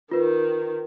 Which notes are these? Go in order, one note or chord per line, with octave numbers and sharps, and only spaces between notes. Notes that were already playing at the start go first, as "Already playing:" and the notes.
D#3 F4 B4